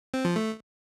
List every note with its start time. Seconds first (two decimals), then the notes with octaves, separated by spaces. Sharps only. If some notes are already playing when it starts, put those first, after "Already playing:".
0.14 C4
0.25 F3
0.36 A3